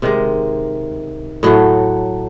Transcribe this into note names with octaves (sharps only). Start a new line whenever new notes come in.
C3 D#3 G#3
A2 F#3 A3